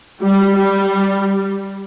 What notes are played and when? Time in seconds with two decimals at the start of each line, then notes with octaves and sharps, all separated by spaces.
0.22 G3
0.57 G3